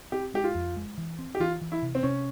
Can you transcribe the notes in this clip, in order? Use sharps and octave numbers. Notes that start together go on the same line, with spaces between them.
C4 G4
G#3 G4
F4
F2
G#3
E3
C4
G4
E3 F4
E3
E4
C3
C4
C3 C#4